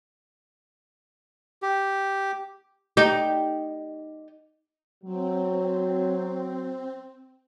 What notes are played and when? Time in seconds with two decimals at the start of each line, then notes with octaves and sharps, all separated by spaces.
1.62 G4
2.97 D#4 G4
5.04 F#3 C4